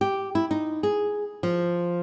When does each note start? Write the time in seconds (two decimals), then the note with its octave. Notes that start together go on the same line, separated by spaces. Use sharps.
0.01 G4
0.35 E4
0.51 D#4
0.83 G#4
1.43 F3